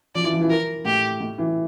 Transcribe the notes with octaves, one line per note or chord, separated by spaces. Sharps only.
F3 D5
E3
F3
E3
A#4
A2 G4
A2
E3